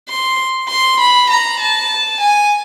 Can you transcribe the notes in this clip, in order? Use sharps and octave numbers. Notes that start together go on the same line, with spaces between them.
C6
C6
B5
A#5
A5
G#5